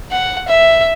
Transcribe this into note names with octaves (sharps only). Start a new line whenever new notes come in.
F#5
E5